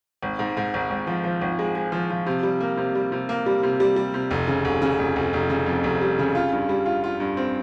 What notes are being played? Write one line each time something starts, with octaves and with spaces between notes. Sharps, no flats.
G#1
G#2
G#2
G#1
G#1
F3
F3
G#1
G#3
G#3
F3
F3
C3
G3
A#3
C3
G3
C3
A#3
G3
C3
G3
G3
C3
F1
C#3
F1
C#3
F1
F1
F1
C#3
F2
F1
G3
C#3
F4
G2
G3
F4
F4
G2
C4